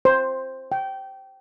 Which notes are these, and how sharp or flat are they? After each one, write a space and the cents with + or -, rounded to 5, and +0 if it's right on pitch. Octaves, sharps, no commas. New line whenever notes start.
C5 +10
G5 -20